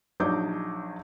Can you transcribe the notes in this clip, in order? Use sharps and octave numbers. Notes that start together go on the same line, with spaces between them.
A#1 F#3 D4 D#4 D6 G6